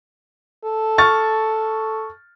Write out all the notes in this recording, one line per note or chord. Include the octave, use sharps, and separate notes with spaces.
A4
C#6 F6 A6